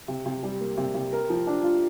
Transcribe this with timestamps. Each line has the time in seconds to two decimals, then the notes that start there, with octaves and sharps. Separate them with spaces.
0.08 C3
0.26 C3
0.43 G3
0.61 A#3
0.77 C3
0.94 C3
1.12 A#4
1.29 F3
1.47 D4
1.63 F4